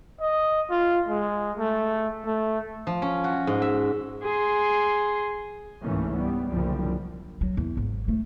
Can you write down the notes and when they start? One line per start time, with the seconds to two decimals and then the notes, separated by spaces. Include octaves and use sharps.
0.21 D#5
0.71 F4
1.08 G#3
1.59 A3
2.25 A3
2.87 F3
3.02 C#4
3.24 F#4
3.47 G#2
3.62 E5
4.23 G#4 C6
5.81 C#2 G#2 E3 A3 A#3 C#4
6.13 G3 B3
6.48 F#1 C2 F#2 D3 F3 G3
7.41 F#3
7.57 E2
7.77 G#1
8.08 A3